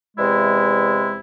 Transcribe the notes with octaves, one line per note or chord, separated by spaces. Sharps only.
E2 C3 G#3 E4